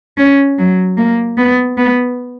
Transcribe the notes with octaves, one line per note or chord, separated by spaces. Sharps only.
C#4
F#3
A#3
B3
B3